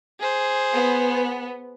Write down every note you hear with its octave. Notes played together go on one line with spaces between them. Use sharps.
G#4 C5
B3